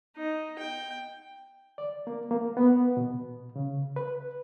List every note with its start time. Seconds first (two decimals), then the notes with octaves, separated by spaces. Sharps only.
0.17 D#4
0.59 G5
1.78 D5
2.07 A#3
2.31 A#3
2.57 B3
2.97 B2
3.56 C#3
3.96 B4